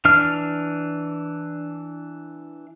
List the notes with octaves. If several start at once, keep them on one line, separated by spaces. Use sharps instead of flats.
E3 D4 F6